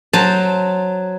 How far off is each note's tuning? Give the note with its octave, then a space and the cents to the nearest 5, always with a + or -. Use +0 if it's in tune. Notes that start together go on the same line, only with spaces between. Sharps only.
F#3 +0 C5 +0 A5 +0